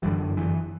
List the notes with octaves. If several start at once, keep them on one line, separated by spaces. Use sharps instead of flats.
G1 F#2 D3 E3 G3
E3